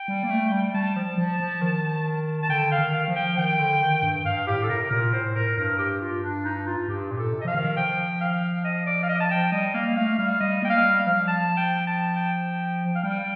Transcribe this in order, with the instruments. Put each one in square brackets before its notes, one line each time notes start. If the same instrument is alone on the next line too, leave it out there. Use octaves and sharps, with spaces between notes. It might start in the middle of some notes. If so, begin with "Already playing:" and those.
Already playing: [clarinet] G5
[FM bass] G3
A#3
A3
G3
[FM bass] G3 [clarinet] A5
[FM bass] F3
F3
F3
D#3
[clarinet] A5
[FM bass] D3 [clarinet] G5
[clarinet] F5
[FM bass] D#3
[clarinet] F5
[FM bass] F3
[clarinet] G5
[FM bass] D#3 [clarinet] G5
[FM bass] D3
D#3
G2
[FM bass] G2 [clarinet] F5
[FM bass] A2 [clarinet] G4
[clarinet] A4
[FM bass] C3 [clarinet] A#4
[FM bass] A#2 [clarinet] A#4
[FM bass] A2 [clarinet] C5
[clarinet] A#4
[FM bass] G2 [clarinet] A#4
[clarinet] G4
F4
D4
D#4
F4
[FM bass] G2 [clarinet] G4
[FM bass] A#2
[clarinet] A4
[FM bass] C3
[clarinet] D#5
[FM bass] F3 [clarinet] F5
[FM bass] D#3
[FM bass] F3 [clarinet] G5
[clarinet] F5
D#5
D5
F5
D#5
A5
G5
[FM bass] G3 [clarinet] D#5
[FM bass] A#3 [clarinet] F5
[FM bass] A3 [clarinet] F5
[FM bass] G3 [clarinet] F5
[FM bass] G3 [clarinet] D#5
[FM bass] A#3 [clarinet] G5
[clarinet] F5
[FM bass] G3
[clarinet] F5
[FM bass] F3
[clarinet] A5
G5
A5
G5
F5
[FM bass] G3 [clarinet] G5